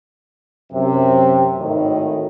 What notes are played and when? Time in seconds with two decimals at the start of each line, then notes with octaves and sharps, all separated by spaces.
0.72 F#2 C3
1.58 G#1 A2 D#3